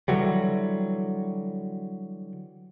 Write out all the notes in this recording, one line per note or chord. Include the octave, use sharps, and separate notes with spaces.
D3 E3 F#3 G3